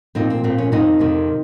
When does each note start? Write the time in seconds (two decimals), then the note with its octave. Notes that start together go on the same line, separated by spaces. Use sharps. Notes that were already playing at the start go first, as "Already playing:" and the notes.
0.15 A#2 F3 A#3 C4 D#4
0.30 C4
0.43 A#2 F3 A#3 C4
0.58 C#4
0.71 F2 C3 D#3 C4 D#4
0.99 F2 C3 D#3